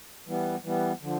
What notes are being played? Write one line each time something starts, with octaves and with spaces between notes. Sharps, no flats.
E3 G3 B3
E3 G3 B3
D3 F3